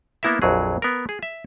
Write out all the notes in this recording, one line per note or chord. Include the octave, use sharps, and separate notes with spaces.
A#3 B3 E4 A#4 E5
A#1 F2 F#3 G#4
B3 A#4
G#4
E5